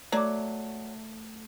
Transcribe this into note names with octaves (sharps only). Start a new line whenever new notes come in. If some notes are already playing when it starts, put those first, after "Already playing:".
F#3 A3 D5 D6